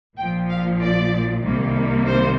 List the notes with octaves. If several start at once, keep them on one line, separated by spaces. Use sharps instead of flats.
A#1 A#2 F3 G5
F5
D5
C2 C3 D#3 G3 A#3
C5